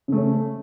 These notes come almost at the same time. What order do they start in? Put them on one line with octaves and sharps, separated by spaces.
C#3 A3 C#4